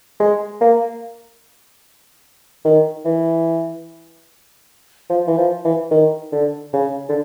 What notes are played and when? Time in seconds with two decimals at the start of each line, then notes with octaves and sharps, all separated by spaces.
0.20 G#3
0.61 A#3
2.65 D#3
3.05 E3
5.10 F3
5.27 E3
5.38 F3
5.65 E3
5.91 D#3
6.32 D3
6.73 C#3
7.09 D3